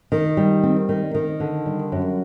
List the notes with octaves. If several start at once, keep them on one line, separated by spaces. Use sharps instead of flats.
D#3
G3
C4
D#3
D#3
D3
G3
F#2